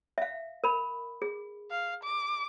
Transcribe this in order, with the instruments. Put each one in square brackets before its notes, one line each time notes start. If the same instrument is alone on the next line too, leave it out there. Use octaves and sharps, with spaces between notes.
[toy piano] E5 F5
A#4 B5
G#4
[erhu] F5
D6